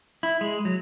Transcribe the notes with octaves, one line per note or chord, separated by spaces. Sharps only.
E4
G#3
F#3